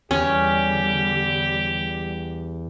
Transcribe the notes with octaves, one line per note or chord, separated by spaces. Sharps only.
E2 D3 G3 C#4 G4